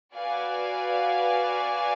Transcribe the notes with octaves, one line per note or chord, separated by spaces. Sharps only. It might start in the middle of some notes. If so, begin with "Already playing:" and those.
F#4 B4 D5 F5 G#5